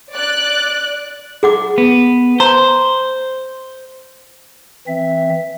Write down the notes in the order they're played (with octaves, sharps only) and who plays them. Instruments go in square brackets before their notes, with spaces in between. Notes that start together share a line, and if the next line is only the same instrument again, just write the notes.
[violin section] D5 F#6
[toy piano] G#4 F#5 D6
[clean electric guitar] B3
[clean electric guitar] C5 [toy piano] A#5
[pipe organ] E3 C4 E5